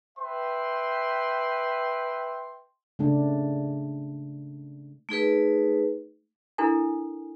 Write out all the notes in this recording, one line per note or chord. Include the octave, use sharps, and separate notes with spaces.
B4 E5 G5 C6
C#3 A3 D4
A3 D#4 G#4 B4
D4 E4 A4 A#4 G#5